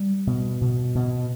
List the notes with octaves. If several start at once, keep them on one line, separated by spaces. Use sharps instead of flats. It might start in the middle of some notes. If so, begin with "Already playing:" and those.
Already playing: G3
B2
B2
B2